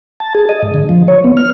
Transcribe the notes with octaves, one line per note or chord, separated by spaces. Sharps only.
A5
G#4
D#5
G#2
D3
F3
C#5
B3
F6